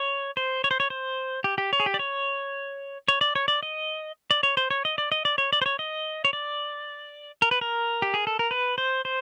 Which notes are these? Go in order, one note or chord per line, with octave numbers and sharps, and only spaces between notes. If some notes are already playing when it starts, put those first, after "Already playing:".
Already playing: C#5
C5
C#5
C5
C#5
C5
G4
G4
C#5
G#4
G4
D5
C#5
C#5
D5
C#5
D5
D#5
D5
C#5
C5
C#5
D#5
D5
D#5
D5
C#5
D5
C5
C#5
D#5
C#5
D5
A#4
B4
A#4
G4
G#4
A4
A#4
B4
C5
C5